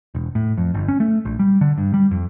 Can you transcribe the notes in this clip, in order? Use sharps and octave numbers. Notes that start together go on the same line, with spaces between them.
E1
A2
F2
G1
C#4
A3
A#1
G3
D3
G2
G3
F2